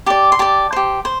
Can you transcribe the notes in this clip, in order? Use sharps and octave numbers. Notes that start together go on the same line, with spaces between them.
G4 D5 A5
C6
G4 D5 A5
G4 C5
C5